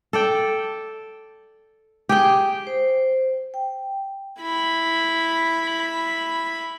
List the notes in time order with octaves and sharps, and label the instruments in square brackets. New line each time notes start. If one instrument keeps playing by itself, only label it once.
[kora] A4 D5 G5
G4 G#4 G5
[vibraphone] C5
G5
[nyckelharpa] E4 B5